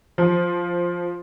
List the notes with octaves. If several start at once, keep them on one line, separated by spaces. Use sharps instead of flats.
F3